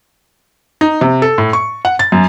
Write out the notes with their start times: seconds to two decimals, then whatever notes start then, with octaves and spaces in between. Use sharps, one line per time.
0.81 D#4
1.01 C3
1.22 A4
1.38 A2
1.53 C#6
1.85 F#5
1.99 A6
2.12 F#2